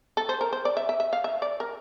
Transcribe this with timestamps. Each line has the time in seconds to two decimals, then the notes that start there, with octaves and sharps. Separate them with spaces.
0.17 A4
0.29 C5
0.41 A#4
0.53 C5
0.65 D5
0.77 E5
0.89 E5
1.00 E5
1.13 F5
1.24 E5
1.42 D5
1.60 A#4